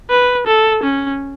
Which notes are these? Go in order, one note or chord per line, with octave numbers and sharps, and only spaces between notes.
B4
A4
C#4